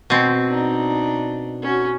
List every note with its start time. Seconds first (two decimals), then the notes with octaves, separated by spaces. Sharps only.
0.10 B2 C4
0.47 D4 D#4
1.62 C#4 F#4